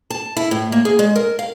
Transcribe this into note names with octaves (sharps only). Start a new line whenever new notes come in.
A5
E4
A2
A#3
G#4
G#3
A#4
F5